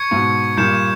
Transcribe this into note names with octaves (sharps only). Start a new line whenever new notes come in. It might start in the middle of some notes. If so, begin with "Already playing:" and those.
Already playing: C#6 G#6 C#7
G#2 B2
G2 A#2 G6 C#7 E7